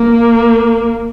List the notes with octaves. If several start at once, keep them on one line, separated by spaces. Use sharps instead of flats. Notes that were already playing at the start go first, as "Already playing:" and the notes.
Already playing: A#3